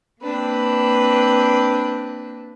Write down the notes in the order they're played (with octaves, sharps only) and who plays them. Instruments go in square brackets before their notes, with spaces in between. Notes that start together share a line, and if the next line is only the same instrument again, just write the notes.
[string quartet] A#3 C4 D4 B4